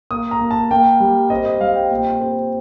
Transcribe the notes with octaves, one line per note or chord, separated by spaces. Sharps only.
A#3 D#6
A#5
A#3
A5
A#3 G5
G3
C4 D#5
D#5
G3 F5
G5
A#2 G5
C4